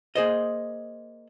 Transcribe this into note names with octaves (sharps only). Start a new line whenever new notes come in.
A#3 G#4 C5 D#5